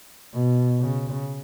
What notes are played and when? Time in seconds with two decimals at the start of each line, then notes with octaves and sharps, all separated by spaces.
0.33 B2
0.80 C#3